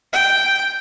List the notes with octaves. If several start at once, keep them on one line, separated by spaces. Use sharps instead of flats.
G5